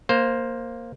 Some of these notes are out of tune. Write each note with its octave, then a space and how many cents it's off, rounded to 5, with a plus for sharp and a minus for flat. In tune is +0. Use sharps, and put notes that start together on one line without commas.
A#3 +0 C5 +10